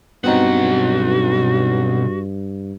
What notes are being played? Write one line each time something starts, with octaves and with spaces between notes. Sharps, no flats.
B1 G2 B3 C4 D#4 F#4 F#5